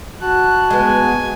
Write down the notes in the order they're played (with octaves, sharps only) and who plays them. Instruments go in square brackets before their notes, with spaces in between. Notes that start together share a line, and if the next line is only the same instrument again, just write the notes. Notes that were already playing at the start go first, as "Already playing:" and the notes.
[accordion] F#4 A5 [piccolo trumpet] F#6
[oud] G#3 B3 [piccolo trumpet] G#5